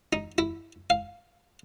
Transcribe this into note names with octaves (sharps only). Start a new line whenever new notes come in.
D#4
E4
F5